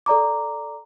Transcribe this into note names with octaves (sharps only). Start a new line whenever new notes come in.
A4 D5 A#5 D6